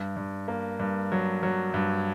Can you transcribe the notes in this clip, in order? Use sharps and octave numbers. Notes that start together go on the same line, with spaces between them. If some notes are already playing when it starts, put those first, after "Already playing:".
Already playing: G2
G2
A#3
G2
F#3
F#3
G2